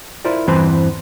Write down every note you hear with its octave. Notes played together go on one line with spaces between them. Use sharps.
E4 F4 A#4 C5 D5
E2 G2 E3 C4 B4 C5